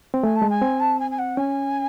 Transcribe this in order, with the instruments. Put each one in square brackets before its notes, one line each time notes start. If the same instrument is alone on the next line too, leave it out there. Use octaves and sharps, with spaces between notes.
[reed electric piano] C4
[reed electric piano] A3 [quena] G#5
[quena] A5
[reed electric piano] G#3
[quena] G#5
[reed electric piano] C4
[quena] A5
G#5
G#5
F#5
[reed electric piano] C#4 [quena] G#5